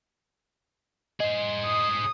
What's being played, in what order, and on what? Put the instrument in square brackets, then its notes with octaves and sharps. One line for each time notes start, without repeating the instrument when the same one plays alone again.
[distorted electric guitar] G#4 C5 [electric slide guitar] D#5
[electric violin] D#6